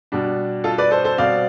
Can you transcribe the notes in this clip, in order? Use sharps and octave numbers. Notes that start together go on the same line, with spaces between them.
B2 G3 D4
F4 A4
B4 D5
A4 C5
A4 C5
B2 G3 C4 D5 F5